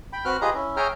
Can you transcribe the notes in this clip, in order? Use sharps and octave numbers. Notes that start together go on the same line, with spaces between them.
G5 B5
C4 F#4 B4 F6 F#6
F4 G4 G#4 B4 D#5 A#5
C#4 E4
G#4 C#5 E5 G5 A#5 F6